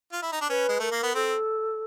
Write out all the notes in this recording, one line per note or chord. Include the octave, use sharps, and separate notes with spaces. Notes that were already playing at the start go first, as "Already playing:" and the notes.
F4
E4
D#4
D4
C#4 B4
G#3
A3 A#4
A#3
B3
C4 A4